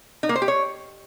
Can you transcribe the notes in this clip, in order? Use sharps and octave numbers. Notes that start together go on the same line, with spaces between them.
D#4
A#3
C5
G4
C#5